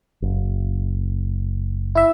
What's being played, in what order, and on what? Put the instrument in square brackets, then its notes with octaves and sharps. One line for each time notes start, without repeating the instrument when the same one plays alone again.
[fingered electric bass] F#1
[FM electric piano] E4 E5